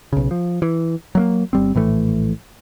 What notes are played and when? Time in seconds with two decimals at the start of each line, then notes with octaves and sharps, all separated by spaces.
0.13 B1 C#3
0.31 F3
0.62 E3
1.15 F#3 A3 A#3
1.53 G1 G3 C4
1.75 A#1 A2 E3 A3